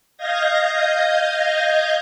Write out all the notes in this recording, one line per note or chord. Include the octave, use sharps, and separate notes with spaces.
D#5 F5 G6 G#6 A#6